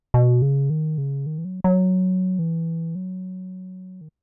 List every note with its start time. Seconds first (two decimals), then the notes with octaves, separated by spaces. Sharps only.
0.14 B2
0.42 C#3
0.70 D#3
0.98 C#3
1.26 D#3
1.38 E3
1.45 F#3
1.64 F#3
2.39 E3
2.95 F#3
4.01 D#3